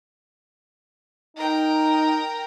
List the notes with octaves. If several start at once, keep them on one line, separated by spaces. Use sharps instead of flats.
D#4 A#4 G5